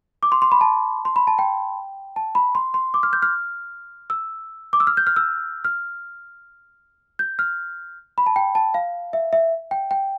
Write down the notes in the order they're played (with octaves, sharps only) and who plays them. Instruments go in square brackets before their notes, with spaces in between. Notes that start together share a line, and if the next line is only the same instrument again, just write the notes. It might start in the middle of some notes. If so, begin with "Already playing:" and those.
[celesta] D6
C6
C6
B5
A5
C6
B5
A5
G5
A5
B5
C6
C6
D6
F6
G6
F6
E6
D6
E6
F6
G6
F6
E6
F6
G6
F6
B5
A5
G5
A5
F5
E5
E5
G5
G5